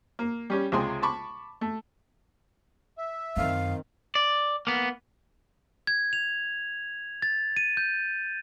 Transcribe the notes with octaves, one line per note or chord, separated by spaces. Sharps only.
A#3
G3 C#4 G4
C#2 C3 G#3 G#4 G5 C6
A5 B5 C#6 D6
A3
E5
F#2 D#3 C4 F5
D5
A#3 B3
G#6
F7
A6
D#7
G6